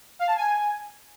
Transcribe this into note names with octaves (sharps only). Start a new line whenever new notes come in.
F5
A5
G#5